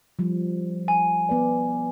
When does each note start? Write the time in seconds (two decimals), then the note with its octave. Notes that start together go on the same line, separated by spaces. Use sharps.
0.19 F3 G3
0.88 G#5
1.29 B3 B4 D5